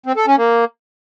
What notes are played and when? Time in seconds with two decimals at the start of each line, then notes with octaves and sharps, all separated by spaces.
0.06 C4
0.17 A4
0.27 C#4
0.38 A#3